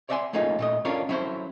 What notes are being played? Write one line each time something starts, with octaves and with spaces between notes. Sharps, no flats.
C#5 D5 E5 F#5 G#5 C6
A3 A#3 C#4 D#4 F4 G#4
A#2 A3 D#5
C#4 D4 F4 A4 A#4 C#5
F#3 C#4 E4 A4 C5